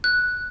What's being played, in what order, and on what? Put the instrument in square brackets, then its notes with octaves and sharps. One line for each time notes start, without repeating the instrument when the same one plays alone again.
[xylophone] F#6